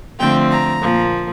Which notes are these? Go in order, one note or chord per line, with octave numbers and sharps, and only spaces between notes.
D3 F3 A3 C4 G5
A#5
A#2 F3 A#3